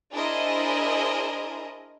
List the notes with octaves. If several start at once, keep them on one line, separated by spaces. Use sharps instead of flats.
D4 E4 G#4 A#4 C5 D#5